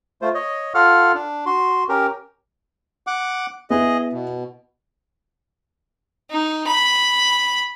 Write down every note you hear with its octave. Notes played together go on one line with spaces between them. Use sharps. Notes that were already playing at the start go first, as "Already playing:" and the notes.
A3 F4 C5
C#5 D#5
F4 A4 F5 F#5 F6
D4
F#4 C6
C#4 G4 A#4
F#5 D6
B3 E4 G#4 D#5
B2
D#4
B5